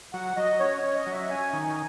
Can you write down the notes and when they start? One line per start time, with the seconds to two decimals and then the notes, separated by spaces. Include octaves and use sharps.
0.13 F#3 F#5
0.36 F#3 D#5
0.60 C#4 C#5
0.77 C#5
0.83 C#4
0.95 D#5
1.06 F#3
1.12 E5
1.29 C#4 G#5
1.53 D#3
1.65 G#5